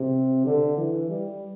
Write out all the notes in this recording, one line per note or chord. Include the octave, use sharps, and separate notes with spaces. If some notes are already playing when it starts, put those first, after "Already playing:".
Already playing: C3
D3
E3
G3